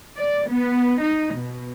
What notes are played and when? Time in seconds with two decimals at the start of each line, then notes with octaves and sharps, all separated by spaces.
0.17 D5
0.50 B3
1.02 D#4
1.34 B2